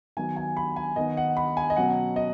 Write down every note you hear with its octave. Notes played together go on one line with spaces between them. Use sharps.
D#3 F#3 B3 G#5
G#5
B5
G#5
D#3 B3 D#5
F#5
B5
G#5
D#5
B2 F#3 C#4 F#5
D#5